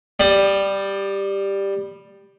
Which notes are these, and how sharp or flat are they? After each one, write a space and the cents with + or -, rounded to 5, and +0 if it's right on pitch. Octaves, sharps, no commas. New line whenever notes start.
G3 +5 D#6 -40